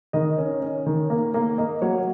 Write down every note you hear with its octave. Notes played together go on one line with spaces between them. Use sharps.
D#3 D#5
C#4
C#4
D#3
A#3
A#3
A#3 D#5
F#3 C#5